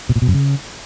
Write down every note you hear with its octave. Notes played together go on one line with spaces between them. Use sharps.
B2
A#2
B2
F#2
C#3